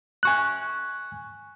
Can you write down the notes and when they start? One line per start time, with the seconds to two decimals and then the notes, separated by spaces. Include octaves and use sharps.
0.23 G#5 C#6 F#6